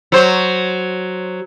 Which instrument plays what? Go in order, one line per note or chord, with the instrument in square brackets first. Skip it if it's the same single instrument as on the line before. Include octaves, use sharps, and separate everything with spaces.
[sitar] F#3 C5